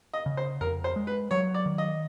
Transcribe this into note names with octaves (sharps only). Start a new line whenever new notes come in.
D#5
C#3
C5
F2 A#4
C5
G#3
B4
F#3 C#5
D5
D#3
D#5